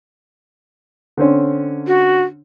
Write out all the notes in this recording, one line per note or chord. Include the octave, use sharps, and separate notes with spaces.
D3 C4 C#4
F#4